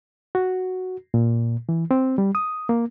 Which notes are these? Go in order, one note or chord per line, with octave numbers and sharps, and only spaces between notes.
F#4
A#2
E3
C4
G3
D#6
A#3